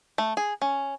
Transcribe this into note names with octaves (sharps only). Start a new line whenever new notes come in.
A3
G#4
C#4